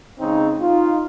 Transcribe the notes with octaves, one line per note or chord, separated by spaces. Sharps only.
C#3 G#3 C4 D#4
D#4 F4